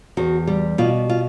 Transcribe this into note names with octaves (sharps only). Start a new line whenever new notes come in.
E2 F#4
G3
B2 F4
F4